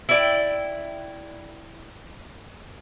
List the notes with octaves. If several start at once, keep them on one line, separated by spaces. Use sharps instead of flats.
E4 D5 G5